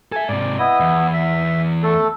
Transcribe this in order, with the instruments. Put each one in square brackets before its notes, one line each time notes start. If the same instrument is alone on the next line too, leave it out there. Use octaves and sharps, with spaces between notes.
[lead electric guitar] A4 E5 [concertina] G#5
[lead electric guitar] G#2 C3 [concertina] D5
[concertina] B3 E4 [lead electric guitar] D#5
[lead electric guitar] E2
[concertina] E5
A3 A4